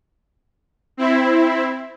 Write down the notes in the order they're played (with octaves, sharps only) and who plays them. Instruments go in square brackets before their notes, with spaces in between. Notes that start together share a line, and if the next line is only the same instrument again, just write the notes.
[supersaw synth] C4 E4